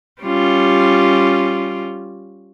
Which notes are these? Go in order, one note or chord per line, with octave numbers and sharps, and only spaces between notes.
G3 C#4 F4